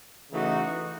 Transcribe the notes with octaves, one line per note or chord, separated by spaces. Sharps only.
C#3 E3 A3 D#4 F#4